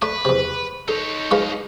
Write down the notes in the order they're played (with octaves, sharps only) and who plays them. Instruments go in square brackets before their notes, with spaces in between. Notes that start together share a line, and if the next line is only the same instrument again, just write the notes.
[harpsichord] A3 D4 [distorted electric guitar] B4
[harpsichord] E2 C3
[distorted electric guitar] D#4 C#5 [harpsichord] A4
[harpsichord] G#3 F4 B4